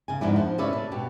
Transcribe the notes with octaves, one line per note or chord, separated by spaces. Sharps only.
C#3 G#5
F2 G#2 B3 D4 E4
F3
A2 C#3 C#4 B4 D5 E5
D4
B2 G4